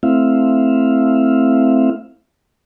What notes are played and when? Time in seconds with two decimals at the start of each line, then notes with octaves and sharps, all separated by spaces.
0.03 A3 C4 E4 E5 F5